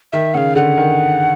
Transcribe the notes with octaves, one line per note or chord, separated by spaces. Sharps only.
D#3 E5
C#3 F5 F#5
D3 F#5
D#3